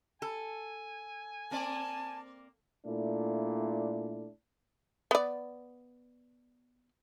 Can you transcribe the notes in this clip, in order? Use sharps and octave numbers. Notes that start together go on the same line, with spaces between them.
A4 G#5
A#3 C4 D5 A5
A#2 A3 D4 E4
B3 D5